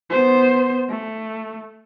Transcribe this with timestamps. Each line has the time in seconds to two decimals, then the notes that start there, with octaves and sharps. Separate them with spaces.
0.10 B3 C5
0.90 A3